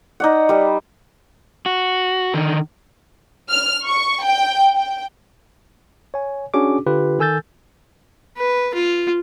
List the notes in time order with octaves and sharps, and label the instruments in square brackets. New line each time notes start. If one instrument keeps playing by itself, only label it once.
[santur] D#4 D5 F#5
G3 B4
[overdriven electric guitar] F#4
D3 D#3
[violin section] F6
C#6
G5
G5
[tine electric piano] C#5 G#5
C#4 D4 F#4 G#4 D6
D3 F4 G4 B4
D#3 A4 G#5 E6 G6 A6
[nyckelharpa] B4
F4